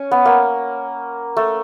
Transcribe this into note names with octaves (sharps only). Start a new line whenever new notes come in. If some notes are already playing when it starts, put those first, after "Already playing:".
Already playing: C#4
B3
A#3
A3